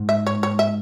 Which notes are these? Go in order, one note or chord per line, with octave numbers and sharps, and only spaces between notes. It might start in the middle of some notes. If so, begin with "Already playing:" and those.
Already playing: G#2
E5
C#5
C#5
E5